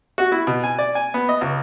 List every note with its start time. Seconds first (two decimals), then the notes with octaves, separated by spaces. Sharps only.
0.18 F#4
0.32 E4
0.47 B2
0.64 G#5
0.79 D5
0.95 G#5
1.14 B3
1.29 D#5
1.41 C#2